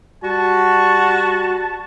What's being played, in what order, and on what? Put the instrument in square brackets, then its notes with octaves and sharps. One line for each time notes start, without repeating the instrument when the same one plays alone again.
[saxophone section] G3 F#4 [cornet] A5